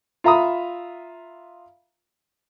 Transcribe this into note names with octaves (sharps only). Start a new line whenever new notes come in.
F4 E5 A#5 B5 D#6